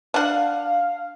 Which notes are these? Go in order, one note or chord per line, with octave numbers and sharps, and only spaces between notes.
D4 F5 F#5